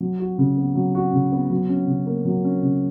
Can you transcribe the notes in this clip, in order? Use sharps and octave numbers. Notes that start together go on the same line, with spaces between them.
F#3
F#4
C#3
B3
F#3
F#4
C#3
B3
F#3
C#4
C#3
A#3
F#3
C#4
C#3